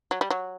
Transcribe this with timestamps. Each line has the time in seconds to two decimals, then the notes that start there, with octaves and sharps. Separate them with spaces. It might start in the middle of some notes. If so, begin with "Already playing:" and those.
0.11 F#3
0.21 G3
0.31 F#3